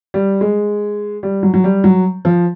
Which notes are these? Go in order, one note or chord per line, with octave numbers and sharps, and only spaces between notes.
G3
G#3
G3
F#3
F#3
G3
F#3
F3